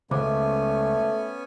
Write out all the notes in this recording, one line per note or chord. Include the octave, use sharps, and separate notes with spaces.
C#2 A3 B3 C#4 C5 G#5 D6